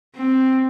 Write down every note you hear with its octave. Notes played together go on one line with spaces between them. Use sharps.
C4